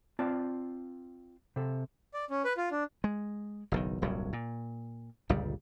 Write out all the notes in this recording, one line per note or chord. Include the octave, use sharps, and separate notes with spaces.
C4 F4 D5 A5
C3 A4
D5
C#4
B4
F4
D4
G#3
F#1 B1 D#3
D#1 C2 G2 F#3
A#2
G1 C#2 A#2 G3